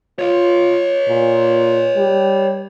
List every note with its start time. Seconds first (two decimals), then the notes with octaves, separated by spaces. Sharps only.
0.19 F4 C#5 D#5
1.09 A#2
1.97 G3